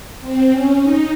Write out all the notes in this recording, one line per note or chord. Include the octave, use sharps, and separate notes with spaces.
C4
C#4
D#4